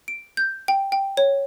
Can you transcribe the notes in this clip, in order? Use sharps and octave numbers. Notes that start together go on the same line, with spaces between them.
D7
G6
G5
G5
C#5